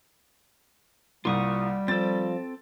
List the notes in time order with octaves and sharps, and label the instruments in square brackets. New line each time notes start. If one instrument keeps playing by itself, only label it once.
[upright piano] C2 A#3 [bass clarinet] G3 [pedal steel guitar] F4 C#6 D#6
[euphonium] F3 [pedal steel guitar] C4 A4 [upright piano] A6